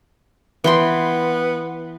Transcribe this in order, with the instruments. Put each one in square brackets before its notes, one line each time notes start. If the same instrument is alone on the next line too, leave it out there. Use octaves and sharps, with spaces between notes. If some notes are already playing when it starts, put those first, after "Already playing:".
[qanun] E3 G5 C6 [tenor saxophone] B3